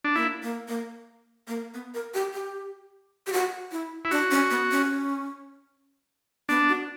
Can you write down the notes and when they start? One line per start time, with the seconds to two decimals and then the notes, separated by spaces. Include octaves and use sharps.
0.04 D4
0.16 A#3 E4
0.43 A#3
0.68 A#3
1.48 A#3
1.74 B3
1.94 A#4
2.14 G4
2.33 G4
3.27 G4
3.33 F#4
3.72 E4
4.05 E4
4.11 D4 F#4
4.31 C#4
4.50 B3
4.71 C#4
6.49 B3 D4
6.69 F#4